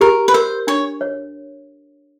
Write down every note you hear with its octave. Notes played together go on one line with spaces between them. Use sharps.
G4 A#4
B4
A#4 C5
D4 C#5
C#5